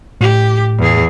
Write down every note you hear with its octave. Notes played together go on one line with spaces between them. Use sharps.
A2 G4
E2 G#4